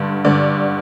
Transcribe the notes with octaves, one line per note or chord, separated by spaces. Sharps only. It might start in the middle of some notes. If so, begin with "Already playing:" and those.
Already playing: G2 D3
G2 D3 D5